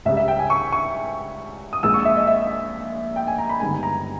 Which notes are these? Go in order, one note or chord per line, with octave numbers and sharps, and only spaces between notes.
C#2 C#3 G3 E5
E5
G5
G#5
C#6
C#6
D#6
A#1 A#2 G#3 E6
C#6
E5
D#5
E5
G5
G#5
A#5
B5
G1 G2 D#3 G#3 G#5
A#5